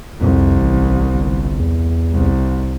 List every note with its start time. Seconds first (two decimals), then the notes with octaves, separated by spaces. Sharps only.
0.21 C2 F2
0.60 A1
1.14 G1
1.59 E2
2.12 C2